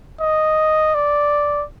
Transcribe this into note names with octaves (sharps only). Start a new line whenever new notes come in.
D#5
D5